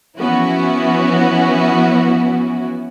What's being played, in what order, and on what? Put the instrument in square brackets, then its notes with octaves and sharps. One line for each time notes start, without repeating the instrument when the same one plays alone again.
[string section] E3 F3 B3 C#4 E4 F#4